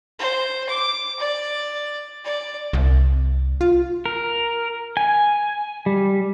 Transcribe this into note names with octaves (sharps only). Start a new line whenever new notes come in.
C5
D6
D5
D5
C2
F4
A#4
G#5
G3